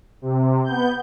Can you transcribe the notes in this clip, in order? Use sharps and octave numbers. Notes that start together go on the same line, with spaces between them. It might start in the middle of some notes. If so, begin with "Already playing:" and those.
C3
B3 G6